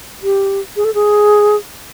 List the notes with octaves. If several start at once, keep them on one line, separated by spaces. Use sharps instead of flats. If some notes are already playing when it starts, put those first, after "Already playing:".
G4
G#4
A4
G#4